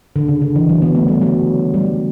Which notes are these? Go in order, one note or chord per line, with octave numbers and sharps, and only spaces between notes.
D3
C#3
D3
E3
F#3
B3
A3
G3
F#3
G3